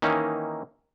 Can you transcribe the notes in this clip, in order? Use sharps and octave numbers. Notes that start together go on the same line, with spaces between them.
D#3 E3 A#3 C#4 D#4